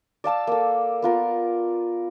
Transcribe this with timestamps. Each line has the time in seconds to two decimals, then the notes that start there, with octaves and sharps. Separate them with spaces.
0.24 D5 F5 A5 E6
0.47 A#3 A4
1.02 B3 F4 A#4